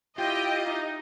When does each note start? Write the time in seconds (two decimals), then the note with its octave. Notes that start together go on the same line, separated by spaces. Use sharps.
0.18 E4 F4 G4 D#5 G5
0.66 D#4